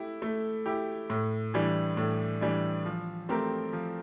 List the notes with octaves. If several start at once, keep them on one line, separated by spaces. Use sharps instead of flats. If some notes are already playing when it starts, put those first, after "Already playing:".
Already playing: A3 E4 G4
A3
E4 G4
A2
E3 G3 D4
A2
E3 G3 D4
F3
A3 C4 G4 A#4
F3